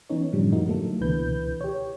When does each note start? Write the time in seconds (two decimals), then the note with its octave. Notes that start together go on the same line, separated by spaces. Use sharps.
0.10 E3 B3 C#4 D#4 C#5
0.33 F#2 A2 D3 E3 F3 G3
0.52 F#2 A#2 A#3 D#4 F#4
0.67 D3 F#3 A3 A#3 A4
1.01 C#2 B2 D3 E3 B4 G6
1.61 G4 C#5